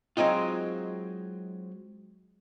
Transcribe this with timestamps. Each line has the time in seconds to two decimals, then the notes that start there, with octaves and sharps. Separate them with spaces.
0.17 F#3 G#3 C4 D#4 F4